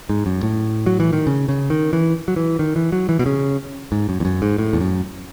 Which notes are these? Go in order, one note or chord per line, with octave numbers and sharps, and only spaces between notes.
G#2
F#2
A2
F#3
E3
D#3
C#3
C#3
D#3
E3
F#3
E3
D#3
E3
F#3
E3
B2
C#3
G#2
F#2
E2
F#2
G#2
A2
E2
F#2